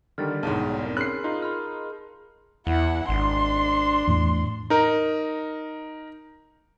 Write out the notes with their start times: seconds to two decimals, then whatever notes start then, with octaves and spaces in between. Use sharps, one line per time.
0.18 D3 D#3 G3 F6 A6
0.43 B1 E2 G#2 G#4 C#5 A5
0.83 C4 A#4
0.97 C#4 G#4 A#4 B5 C6 F6 F#6 C7
1.24 D#4 F4 C6
1.42 B5 C6 F6
2.67 E2 E4 F#5
3.09 G#1 D4 C6
4.07 E2 A2
4.70 D#4 A#4